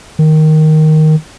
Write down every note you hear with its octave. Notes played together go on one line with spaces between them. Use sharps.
D#3